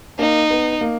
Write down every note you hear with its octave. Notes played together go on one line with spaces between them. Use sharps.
A#3 D#4
B3
A#3